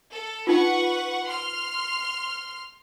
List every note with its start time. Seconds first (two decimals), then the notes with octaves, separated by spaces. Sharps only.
0.13 A4
0.47 D#4 F4 B4 F#5 C#6
1.25 C6 F6